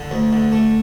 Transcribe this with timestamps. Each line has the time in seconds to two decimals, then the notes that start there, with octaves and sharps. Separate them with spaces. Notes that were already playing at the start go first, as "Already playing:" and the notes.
Already playing: D3
0.11 D2
0.33 D3
0.52 A3